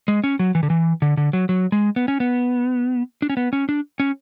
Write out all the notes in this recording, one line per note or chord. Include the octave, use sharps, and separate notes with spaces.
G#3
C#4
F#3
E3
D3
E3
D3
D3
F#3
F#3
G#3
B3
C#4
B3
D4
C#4
B3
C#4
D4
C#4